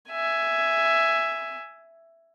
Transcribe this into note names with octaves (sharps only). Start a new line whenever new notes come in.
E5 G#5